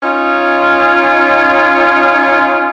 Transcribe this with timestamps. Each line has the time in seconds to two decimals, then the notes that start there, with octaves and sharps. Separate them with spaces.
0.03 C#4 D#4 F4